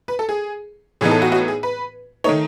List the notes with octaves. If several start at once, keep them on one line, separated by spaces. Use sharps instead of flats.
B4
A4
G#4
A2 E3 B3 D#4 G#4
A4
F#4
F#4
G#4
B4
D#3 A3 D#4 C#5